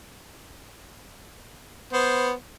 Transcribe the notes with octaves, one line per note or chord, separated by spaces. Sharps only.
B3 C5